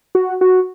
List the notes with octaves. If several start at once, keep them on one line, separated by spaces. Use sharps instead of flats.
F#4
F#4